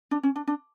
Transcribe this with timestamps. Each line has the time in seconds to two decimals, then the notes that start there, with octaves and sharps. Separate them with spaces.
0.11 D4
0.23 C#4
0.36 D4
0.47 D4